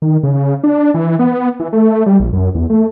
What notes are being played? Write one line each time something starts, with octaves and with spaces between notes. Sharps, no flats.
D#3
C#3
D4
E3
B3
E3
A3
G3
A#1
F#2
E2
A3